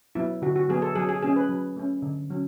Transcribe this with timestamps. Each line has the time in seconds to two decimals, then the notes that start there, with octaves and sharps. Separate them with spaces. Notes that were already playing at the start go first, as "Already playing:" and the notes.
0.15 F#3 B3 E4
0.42 D3 F#4
0.56 F#4
0.69 F#3 B3 G#4
0.82 A4
0.95 F#3 G#4
1.09 G#4
1.22 A3 C#4 G#4
1.36 B4
1.49 F#3
1.76 A3 C#4
2.02 D3
2.30 F#3 C#4